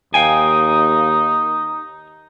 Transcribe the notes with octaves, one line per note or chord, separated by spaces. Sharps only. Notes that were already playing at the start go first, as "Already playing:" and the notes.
D#2 D#4 F5 G5 G#5